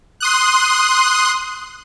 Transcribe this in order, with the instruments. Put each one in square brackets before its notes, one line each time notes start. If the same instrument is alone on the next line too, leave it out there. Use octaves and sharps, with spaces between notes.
[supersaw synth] C6 D#6 F#6